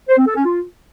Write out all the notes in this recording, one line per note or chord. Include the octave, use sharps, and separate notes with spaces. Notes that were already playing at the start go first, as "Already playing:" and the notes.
C5
C4
A4
C#4
F4